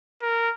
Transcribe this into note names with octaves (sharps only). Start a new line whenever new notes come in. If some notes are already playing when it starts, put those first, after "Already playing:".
A#4